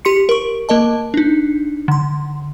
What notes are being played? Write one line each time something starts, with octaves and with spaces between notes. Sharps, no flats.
G4 C6 C#7
A#4 C#6
A#3 A#4 D#5 A5
D4 D#4
D3 C6